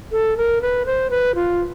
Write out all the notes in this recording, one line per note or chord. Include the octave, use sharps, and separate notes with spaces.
A4
A#4
B4
C5
B4
F4